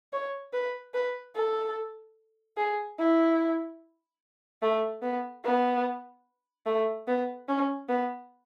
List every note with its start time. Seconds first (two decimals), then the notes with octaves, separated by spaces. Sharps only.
0.13 C#5
0.53 B4
0.94 B4
1.35 A4
2.57 G#4
2.99 E4
4.62 A3
5.02 B3
5.44 B3
6.66 A3
7.07 B3
7.48 C#4
7.89 B3